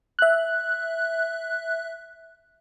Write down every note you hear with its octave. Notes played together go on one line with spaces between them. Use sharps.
E5 F#6